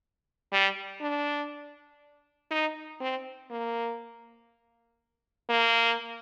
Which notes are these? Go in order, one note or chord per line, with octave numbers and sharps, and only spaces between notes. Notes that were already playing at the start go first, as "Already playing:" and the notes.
G3
D4
D#4
C4
A#3
A#3